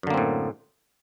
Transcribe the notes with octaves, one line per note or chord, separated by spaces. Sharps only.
F#2 A2 D3 A#3 C4